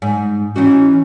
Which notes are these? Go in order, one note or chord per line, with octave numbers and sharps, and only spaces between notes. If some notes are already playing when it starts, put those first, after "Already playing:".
G#2
E3 C#4 D#4 F#4